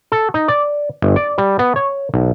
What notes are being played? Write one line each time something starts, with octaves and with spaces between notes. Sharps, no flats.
A4
D#4
D5
G1
D5
G3
B3
C#5
B1